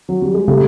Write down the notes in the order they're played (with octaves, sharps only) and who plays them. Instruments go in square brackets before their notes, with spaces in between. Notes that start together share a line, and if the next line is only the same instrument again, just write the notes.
[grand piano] F#3
G3
G#3
[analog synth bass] C#3 [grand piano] G3 A3